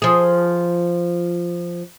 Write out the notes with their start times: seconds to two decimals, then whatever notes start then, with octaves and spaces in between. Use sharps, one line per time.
0.02 F3 G#4